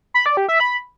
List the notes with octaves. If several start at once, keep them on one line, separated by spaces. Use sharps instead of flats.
B5
D5
G4
E5
B5